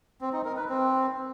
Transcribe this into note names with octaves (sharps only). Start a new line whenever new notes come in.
C4
D#4
A#4
B4
C4